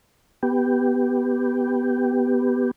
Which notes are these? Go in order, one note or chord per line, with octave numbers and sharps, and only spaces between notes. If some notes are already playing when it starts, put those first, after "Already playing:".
B3 G4